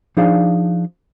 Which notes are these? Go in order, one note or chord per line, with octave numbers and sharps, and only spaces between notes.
F3 D4 D#4 G#4 D5 F5